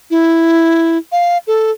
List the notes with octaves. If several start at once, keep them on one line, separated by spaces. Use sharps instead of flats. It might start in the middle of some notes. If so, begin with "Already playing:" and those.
E4
F5
A4